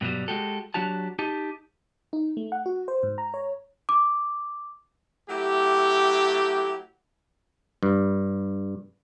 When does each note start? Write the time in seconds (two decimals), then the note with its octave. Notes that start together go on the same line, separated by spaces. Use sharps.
0.01 G2 B2 D3 F#3 G3
0.28 G#3 F#4 G4 A4
0.74 F#3 D4 F#4 G4 A5
1.19 D#4 G4 A5
2.13 D#4
2.37 A3
2.52 F#5
2.66 F#4
2.88 C5
3.03 G#2
3.18 A#5
3.34 C#5
3.89 D6
5.29 F#3 A3 E4 G4
7.83 G2